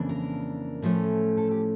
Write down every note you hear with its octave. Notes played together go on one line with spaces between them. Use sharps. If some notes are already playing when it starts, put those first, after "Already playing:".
Already playing: F2 C#3 E3 A#3 D4
A#4
A2 F3 A3 C#4
A4
G4